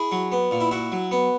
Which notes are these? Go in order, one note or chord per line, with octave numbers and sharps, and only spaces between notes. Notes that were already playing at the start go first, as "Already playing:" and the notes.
Already playing: E4 G#4
F#3
B3
A#2
E4
E4 F#4
F#3
B3